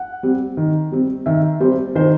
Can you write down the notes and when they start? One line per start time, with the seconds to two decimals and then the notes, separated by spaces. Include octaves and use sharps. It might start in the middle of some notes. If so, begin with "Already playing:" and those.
Already playing: F#5
0.23 G3 C4
0.57 D#3
0.92 G3 C4
1.26 D#3 E5
1.60 G3 C4 C5
1.95 D#3 C5